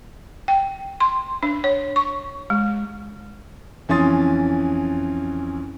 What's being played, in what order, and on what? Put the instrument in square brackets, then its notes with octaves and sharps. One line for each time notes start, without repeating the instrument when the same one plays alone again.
[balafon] G5
C6
D4
C#5
C#6
G#3
[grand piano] F2 E3 C#4 C6 D#6 A6